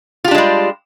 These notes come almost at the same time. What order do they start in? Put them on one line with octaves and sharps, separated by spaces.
F4 G4 D4 G#3 G3